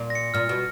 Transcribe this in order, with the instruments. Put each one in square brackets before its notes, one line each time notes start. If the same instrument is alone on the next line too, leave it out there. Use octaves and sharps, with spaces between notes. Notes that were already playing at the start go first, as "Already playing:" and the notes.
Already playing: [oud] A#2
[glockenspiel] A#6
C#7
[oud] A#2 [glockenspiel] F6
[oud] B2